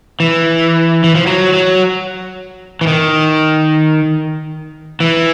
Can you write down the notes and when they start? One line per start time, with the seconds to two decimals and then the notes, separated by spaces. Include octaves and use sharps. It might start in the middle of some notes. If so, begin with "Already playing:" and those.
0.20 E3
1.04 E3
1.15 F3
1.27 F#3
1.53 F#3
2.81 E3
2.87 D#3
5.00 E3